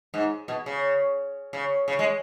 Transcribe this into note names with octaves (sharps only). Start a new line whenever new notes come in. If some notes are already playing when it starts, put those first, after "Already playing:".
G#2
B2
C#3
C#3
C#3
G#3